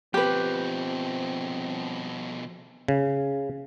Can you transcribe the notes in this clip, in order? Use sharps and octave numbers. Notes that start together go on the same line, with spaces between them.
B2 F3 C4 G4 B4
C#3